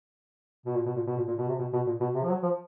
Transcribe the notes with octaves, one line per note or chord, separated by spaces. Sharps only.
B2
A#2
B2
A#2
B2
A#2
A#2
B2
C3
B2
B2
A#2
B2
C3
F3
F#3
F3